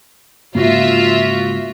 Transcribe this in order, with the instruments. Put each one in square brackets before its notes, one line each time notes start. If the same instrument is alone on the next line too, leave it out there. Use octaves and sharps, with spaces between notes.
[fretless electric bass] G#2 C#3 A#3 [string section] F4 E5 [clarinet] F#4